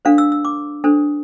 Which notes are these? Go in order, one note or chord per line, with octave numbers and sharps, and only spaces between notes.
D4 A4 C5 F5
E6
E6
D6
D4 A4 C5